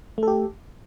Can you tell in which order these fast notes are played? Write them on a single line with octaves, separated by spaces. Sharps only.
A3 A4 G4